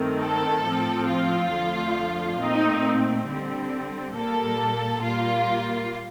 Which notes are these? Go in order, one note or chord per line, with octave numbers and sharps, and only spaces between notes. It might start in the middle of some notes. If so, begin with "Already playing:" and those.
Already playing: G2 D#3 A3 C4
A4
A2 F3 C4
F4
F2 D3 F3 A3
A#2 A3 C4 D#4
D3 G3 C4
A#2 G3 A#3 A4
A#2 G3 A#3 F4